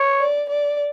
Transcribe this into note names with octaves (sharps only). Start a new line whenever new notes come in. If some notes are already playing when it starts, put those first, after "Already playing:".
Already playing: C#5
D5
D5